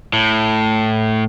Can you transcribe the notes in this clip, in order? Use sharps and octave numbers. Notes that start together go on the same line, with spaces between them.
A2